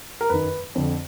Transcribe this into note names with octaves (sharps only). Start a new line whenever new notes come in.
A#4
F#2 D#3 B4
F2 D3